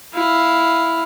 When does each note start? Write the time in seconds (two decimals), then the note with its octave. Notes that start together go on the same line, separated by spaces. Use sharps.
0.14 E4 F5